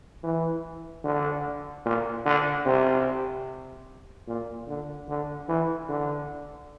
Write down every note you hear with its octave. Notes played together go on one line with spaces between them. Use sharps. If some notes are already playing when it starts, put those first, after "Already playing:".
E3
D3
A#2
D3
C3
A#2
D3
D3
E3
D3